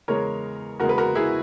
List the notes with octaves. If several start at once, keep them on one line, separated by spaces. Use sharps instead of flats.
E2 C#3 G#3 A#4 C#5
E2 C#3 G#3 F#4 A#4
B4
F#4 A#4
E4 G#4